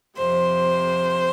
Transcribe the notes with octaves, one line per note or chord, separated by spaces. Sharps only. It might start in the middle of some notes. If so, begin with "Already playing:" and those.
F2 C3 C5